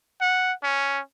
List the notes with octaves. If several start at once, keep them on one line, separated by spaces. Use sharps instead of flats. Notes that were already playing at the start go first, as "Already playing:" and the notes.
F#5
C#4